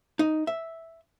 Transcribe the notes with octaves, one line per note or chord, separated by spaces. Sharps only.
D#4
E5